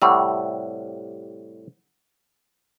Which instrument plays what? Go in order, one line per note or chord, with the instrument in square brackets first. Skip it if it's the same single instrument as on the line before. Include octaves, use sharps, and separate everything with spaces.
[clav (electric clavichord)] A2 C3 G3 [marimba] F#5 C#6 E6